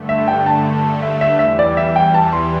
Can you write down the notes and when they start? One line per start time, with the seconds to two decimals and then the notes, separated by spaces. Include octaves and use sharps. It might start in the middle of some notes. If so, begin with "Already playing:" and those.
Already playing: G2 D3 A3
0.09 E5
0.28 G5
0.46 A5
1.02 E5
1.21 E5
1.39 E2 E3 G3 E5
1.59 D5
1.77 E5
1.96 G5
2.14 A5
2.33 C6